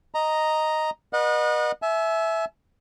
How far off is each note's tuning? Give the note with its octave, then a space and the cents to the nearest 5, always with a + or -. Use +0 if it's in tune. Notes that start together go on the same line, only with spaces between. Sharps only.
D#5 +0 A#5 +0
B4 -40 D#5 -30 F#5 -30
E5 +0 G#5 +40